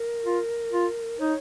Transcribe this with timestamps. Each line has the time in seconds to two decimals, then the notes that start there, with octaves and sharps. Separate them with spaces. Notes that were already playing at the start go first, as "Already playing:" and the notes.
Already playing: A#4
0.25 F4
0.72 F4
1.19 D#4 C#5